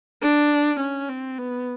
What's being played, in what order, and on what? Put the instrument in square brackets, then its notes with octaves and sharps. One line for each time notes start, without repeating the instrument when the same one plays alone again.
[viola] D4
C#4
C4
B3